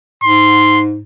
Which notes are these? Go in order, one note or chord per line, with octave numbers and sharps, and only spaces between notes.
G#2 C6